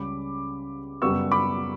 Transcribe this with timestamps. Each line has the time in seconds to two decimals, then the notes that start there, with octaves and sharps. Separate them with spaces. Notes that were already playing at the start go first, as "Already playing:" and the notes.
Already playing: C#2 C#3 G3 C#4 B5 D6
1.02 F#2 C#3 G3 B3 C#6 E6
1.32 B5 D6